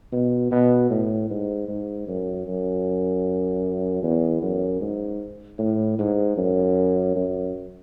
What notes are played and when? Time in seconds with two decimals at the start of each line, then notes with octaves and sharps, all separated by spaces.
0.12 B2
0.51 B2
0.90 A2
1.30 G#2
1.68 G#2
2.07 F#2
2.47 F#2
4.02 E2
4.42 F#2
4.81 G#2
5.59 A2
5.99 G#2
6.37 F#2
7.15 F#2